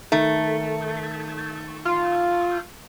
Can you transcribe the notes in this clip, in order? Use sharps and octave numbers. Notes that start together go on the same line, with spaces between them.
D#3 A3
F4